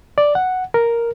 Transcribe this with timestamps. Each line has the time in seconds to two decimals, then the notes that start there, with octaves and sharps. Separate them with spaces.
0.18 D5
0.35 F#5
0.74 A#4